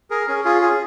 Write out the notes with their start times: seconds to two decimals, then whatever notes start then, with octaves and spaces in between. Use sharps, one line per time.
0.10 G#4 A#4
0.27 C#4 G#4
0.45 F4 G#4
0.62 G#4